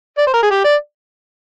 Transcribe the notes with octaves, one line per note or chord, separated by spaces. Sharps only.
D5
C5
A#4
G#4
G4
D5